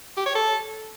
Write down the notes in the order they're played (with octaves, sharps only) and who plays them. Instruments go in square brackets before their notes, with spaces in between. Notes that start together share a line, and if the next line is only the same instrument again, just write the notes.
[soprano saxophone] G4
C#5
A4